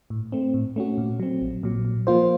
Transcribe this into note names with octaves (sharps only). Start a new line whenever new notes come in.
A2
A3 C4
A2
A3 C#4 F#4
A#2
F#3 C4
A#1
A#2 F#3
A#2
F3 A#3 F4 C5